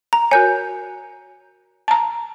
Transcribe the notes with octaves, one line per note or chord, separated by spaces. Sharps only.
A#5
F#4 A#4 C#5 G#5 G6
A5 A#5